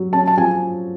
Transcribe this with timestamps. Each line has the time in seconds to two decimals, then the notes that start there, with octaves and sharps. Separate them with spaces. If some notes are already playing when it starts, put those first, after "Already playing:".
Already playing: F#3
0.13 C#4 A5
0.28 A5
0.37 F3 G#5